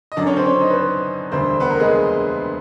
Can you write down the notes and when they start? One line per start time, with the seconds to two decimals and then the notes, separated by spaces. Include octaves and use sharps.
0.12 D#5
0.17 F#2 D3 F#3 D4 D5
0.27 C#4 C#5
0.37 C4 C5
0.46 C#4 C#5
0.60 D#4 D#5
0.70 B4
0.74 C4 C5
1.32 E1 D2 D3 G3 C4 C5
1.60 B3 B4
1.70 A#3 A#4
1.80 G#3 G#4